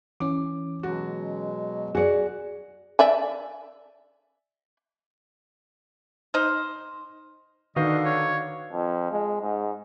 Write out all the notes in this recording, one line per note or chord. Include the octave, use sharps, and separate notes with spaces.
E3 C#4 D6
B2 F#3 G#3 F#4
F#4 G#4 D5 C#7
D5 E5 G#5
D#4 C5 F6
D3 D#3 F#4 B4 D#5 F5
C#5
F2
G#3
G#2